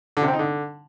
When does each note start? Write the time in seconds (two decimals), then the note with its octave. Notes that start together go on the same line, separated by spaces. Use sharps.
0.17 D3
0.22 C3
0.28 C4
0.33 D#4
0.39 D3